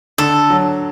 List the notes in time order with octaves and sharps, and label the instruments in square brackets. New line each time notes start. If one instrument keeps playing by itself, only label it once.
[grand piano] D3 [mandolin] A4
[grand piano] F#3